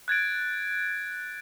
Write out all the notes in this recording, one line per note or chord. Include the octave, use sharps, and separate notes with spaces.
F#6 G#6 A6 D7